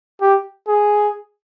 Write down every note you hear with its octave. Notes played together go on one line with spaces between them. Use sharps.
G4
G#4